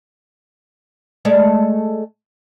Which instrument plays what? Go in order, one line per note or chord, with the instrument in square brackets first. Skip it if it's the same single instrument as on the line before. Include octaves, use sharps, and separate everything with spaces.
[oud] G#3 A3 D5